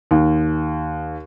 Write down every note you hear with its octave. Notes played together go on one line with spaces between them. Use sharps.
D#2